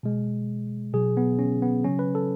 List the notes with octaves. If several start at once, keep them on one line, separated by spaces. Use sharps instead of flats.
B2 G#3
B2 F#3 G#4
B3
C#4
B3
C#3 F#3 C#4
B4
A4